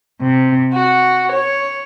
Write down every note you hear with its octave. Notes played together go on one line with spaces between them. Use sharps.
C3
F#4
C#5